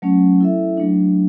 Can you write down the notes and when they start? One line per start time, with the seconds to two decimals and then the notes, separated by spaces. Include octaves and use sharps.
0.02 F#3 A3 C#4
0.41 E4 A4 E5
0.77 F#3 A3 D4